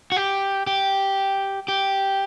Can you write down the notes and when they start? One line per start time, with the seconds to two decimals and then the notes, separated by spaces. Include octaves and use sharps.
0.12 F#4
0.17 G4
0.67 G4
1.68 G4